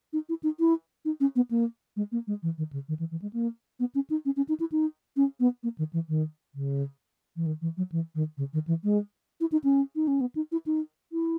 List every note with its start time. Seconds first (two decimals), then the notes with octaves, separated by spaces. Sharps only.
0.13 D#4
0.29 E4
0.43 D#4
0.60 E4
1.05 D#4
1.20 C#4
1.36 B3
1.51 A#3
1.96 G#3
2.12 A#3
2.27 G#3
2.43 E3
2.58 D#3
2.73 C#3
2.88 D#3
2.99 E3
3.11 E3
3.22 G#3
3.33 A#3
3.80 B3
3.95 C#4
4.10 D#4
4.25 C#4
4.37 C#4
4.49 D#4
4.60 E4
4.72 D#4
5.16 C#4
5.40 B3
5.63 A#3
5.78 D#3
5.93 E3
6.09 D#3
6.55 C#3
7.36 E3
7.46 D#3
7.62 E3
7.77 F#3
7.92 E3
8.15 D#3
8.37 C#3
8.53 D#3
8.68 E3
8.84 G#3
9.41 E4
9.52 D#4
9.64 C#4
9.96 D#4
10.08 C#4
10.21 B3
10.35 D#4
10.52 E4
10.66 D#4
11.12 E4